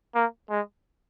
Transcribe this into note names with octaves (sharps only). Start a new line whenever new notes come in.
A#3
G#3